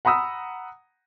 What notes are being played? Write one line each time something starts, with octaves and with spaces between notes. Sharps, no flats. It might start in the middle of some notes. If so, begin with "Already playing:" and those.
F#5 A#5 B5 D#6 E6